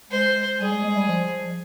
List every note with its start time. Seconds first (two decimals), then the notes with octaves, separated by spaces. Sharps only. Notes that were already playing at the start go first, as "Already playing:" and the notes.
0.10 G#3 C5
0.60 G3 G#4
0.72 G#3
0.84 G#3
0.96 G3
1.09 F3